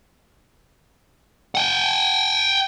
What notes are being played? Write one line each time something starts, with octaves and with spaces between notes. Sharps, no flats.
F#5 G5